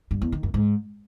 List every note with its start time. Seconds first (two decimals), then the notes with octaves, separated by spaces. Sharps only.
0.11 G2
0.22 E2
0.32 D#3
0.43 F#2
0.54 G#2